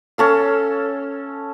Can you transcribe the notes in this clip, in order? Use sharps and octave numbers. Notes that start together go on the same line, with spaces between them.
C#4 A4 F5